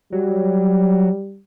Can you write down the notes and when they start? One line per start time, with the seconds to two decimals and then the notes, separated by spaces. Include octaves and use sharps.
0.12 F#3 G3